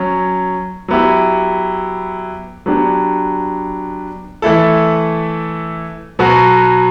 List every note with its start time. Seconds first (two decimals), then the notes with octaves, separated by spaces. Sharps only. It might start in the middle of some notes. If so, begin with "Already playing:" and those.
Already playing: F#3 C#4
0.88 F#3 B3 E4 G4
2.66 F#3 B3 D4 G4
4.42 E3 A3 E4 A4
6.19 B2 F#3 B3 F#4